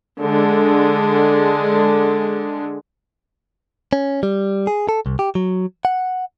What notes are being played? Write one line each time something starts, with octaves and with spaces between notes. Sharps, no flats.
D3 G#3
C#4
G3
G#4
A4
C2
G4
F#3
F#5